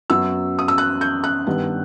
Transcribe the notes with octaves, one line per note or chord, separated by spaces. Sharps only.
F#2 F#3 B3 E6
D#6
E6
F#6
G6
F#6
G2 D#3 G3 B3